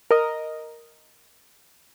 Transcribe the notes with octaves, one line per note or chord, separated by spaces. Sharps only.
A#4 D#5